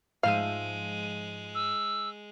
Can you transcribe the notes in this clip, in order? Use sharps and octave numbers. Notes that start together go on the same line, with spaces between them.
G#2 F3 G#3 E5 F5
E6